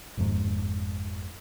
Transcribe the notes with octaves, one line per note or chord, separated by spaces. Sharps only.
G1 F2 G#2